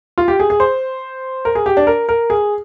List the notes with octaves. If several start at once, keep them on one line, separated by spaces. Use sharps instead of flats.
F4
G4
G#4
G#4
C5
A#4
G#4
G4
D4
A#4
A#4
G#4